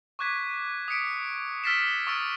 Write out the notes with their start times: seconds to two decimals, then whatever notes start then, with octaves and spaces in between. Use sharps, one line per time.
0.19 C#6 D6 F#6 G#6 B6
0.88 D#6 B6 C#7 D7
1.64 E6 F6 A6 B6 C7 E7
2.07 C#6 D#6 E6 A6 D7